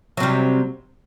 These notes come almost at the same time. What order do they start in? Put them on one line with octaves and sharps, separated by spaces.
F#3 C3 G3